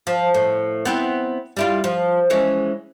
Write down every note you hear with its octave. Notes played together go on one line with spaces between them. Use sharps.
F3
A2
B3 C4 E4
G3 E4 F4
F3
E3 G#3 C#4